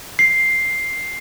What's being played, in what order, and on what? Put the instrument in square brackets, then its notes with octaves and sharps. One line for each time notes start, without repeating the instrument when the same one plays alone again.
[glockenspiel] C7